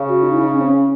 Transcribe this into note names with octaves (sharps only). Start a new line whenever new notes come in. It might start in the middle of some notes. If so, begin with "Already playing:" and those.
Already playing: C#3
F#4
D#4
E4
D#4
C#4
C4
C#4